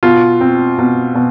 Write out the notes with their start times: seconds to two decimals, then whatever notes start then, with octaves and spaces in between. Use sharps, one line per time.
0.03 B2 F4
0.41 C4
0.79 B2
1.15 B2